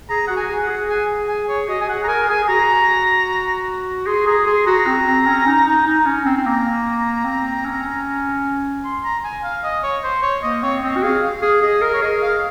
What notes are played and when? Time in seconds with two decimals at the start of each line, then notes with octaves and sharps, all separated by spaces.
0.09 G#4 A#5
0.28 F#4 F#5
0.37 G#5
0.50 G#4
0.62 F#5
0.69 G#4
0.89 G#5
1.28 G#5
1.48 C#5
1.68 F#4 D#5
1.81 G#5
1.88 G#4 F#5
2.04 A#5
2.08 A#4 G#5
2.29 G#4 G#5
2.44 G#4
2.48 F#4 A#5
4.07 G#4 C6
4.27 G#4 A#5
4.47 G#4 C6
4.67 F#4 A#5
4.87 C4
5.07 C4
5.27 C#4
5.47 D#4
5.66 D#4
5.87 D#4
6.06 C#4
6.25 C4
6.37 C4
6.46 A#3 A#5
7.25 C4
7.65 C#4
8.85 C6
9.04 A#5
9.24 G#5
9.43 F5
9.64 D#5
9.83 C#5
10.04 C5
10.23 C#5
10.43 A#3 D#5
10.63 C4 C#5
10.82 C4 D#5
10.97 F#4
11.03 G#4 F5
11.23 F5
11.42 G#4
11.62 G#4 D#5
11.82 A#4
11.93 C#5
12.02 G#4 D#5
12.22 F5